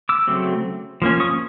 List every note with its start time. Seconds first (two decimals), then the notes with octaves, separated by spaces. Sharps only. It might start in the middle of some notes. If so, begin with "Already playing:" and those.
0.09 D6 E6
0.27 C#3 F#3 A3 C4
1.02 F3 A#3 C#4
1.20 C#6 D#6